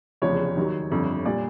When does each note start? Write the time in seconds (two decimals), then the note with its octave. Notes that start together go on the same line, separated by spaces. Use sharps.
0.22 F1 E2 C#3 F3 C#5
0.57 D#2 D#3 F#3
0.91 G1 F2 D3
1.25 A#2 G3 D5